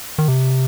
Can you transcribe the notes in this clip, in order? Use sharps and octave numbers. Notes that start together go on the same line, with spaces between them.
D#3
C3